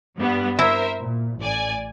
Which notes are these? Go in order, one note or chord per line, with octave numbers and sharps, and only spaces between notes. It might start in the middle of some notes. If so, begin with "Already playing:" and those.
G2 G3 B3
E4 A#4 C5 E5
A#2
A1 D5 G#5